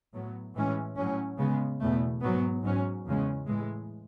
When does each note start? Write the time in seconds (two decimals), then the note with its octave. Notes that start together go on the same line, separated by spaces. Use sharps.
0.13 A2 F#3 B3
0.55 A2 E3 G#3 C#4
0.97 A2 F#3 C#4
1.38 C#3 G#3 B3
1.79 E2 B2 A3
2.22 G#2 F#3 B3
2.63 G#2 F#3 C#4
3.05 E2 C#3 G#3 C#4
3.47 A2 E3 G#3